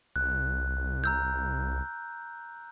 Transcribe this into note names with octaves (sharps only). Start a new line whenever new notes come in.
C2 F#6
A#5 E6 G6